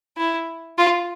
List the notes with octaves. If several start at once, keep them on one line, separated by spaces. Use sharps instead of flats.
E4
F4